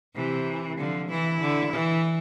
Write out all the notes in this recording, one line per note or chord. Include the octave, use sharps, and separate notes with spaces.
C3 E3
D3 F3
E3 E4
D3
E3